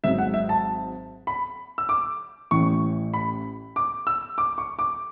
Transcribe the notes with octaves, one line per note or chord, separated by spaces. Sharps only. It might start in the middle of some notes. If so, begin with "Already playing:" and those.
G#1 G#2 F#3 E5
F#5
E5
A5
B5
E6
D6
A1 A2 E3 C#6
B5
D6
E6
D6
C#6
D6